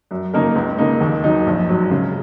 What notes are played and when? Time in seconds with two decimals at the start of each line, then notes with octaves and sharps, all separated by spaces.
0.11 F#2
0.34 C#3 A#3 D#4 A#4
0.55 C#2
0.78 C#3 A#3 D#4
1.01 D#2
1.24 D#3 F#3 D#4
1.47 A#1
1.69 G#2 F#3
1.91 C#3